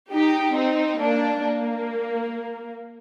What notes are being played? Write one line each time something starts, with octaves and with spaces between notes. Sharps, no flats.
D#4 G4
C4 D#4
A#3 D4
A#3